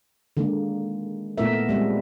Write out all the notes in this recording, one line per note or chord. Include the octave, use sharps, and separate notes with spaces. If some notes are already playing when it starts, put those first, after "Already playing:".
D3 D#3 G#3 A#3
A#2 A3 B3 D#4 A#4 E5
G3 G#3 C4